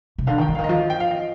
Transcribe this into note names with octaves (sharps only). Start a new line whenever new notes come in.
C3
D3 F5
D#3 G5
D3
D#3 F5
D#5
F3 F5
G5
F5
D#5